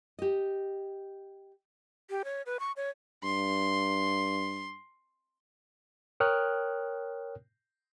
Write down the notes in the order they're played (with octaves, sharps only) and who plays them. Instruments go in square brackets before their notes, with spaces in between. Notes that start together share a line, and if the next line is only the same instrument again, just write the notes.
[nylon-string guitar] G4 D#5
[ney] G4
C#5
B4
C#6
C#5
[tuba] G2 [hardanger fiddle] C6
[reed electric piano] A#4 C#5 G5 D#6 F6 F#6